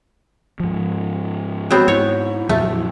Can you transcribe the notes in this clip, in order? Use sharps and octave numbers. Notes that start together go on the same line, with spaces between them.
G#2 F3
F#3 B3 C4 F#4
G#2 E4 C#5
F2 A#2 F#3 A3